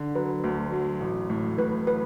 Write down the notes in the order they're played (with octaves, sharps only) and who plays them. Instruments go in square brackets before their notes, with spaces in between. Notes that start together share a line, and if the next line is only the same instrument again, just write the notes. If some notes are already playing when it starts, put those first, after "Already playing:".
Already playing: [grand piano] D3
[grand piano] F#3 [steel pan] B4
[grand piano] D2
F#3
A1
A2
[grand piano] A2 [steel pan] B4
[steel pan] B4